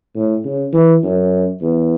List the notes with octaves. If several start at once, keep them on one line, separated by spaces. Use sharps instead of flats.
A2
C#3
E3
F#2
E2